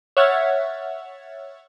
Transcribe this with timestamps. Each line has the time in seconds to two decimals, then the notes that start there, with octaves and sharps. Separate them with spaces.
0.17 C#5 E5 F#5 F6 G#6 A6